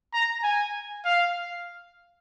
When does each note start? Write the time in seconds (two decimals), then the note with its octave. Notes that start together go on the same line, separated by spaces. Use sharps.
0.14 A#5
0.44 G#5
1.05 F5